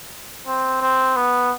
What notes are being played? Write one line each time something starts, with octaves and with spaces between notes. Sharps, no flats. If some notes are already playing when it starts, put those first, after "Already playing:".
C4
C4
B3